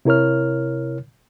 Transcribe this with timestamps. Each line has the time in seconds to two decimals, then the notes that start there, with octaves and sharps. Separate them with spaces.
0.05 C3 E4 A#4 C#5 F6